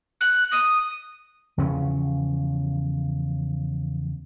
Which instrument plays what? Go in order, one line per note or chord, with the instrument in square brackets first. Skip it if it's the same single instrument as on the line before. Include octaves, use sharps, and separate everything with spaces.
[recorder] F#6
D#6
[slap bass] E2 C#3 F3 C#4